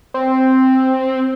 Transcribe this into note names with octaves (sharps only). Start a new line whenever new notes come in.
C4